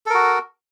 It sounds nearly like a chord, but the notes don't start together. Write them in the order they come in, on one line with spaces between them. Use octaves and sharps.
A4 A#4 F#4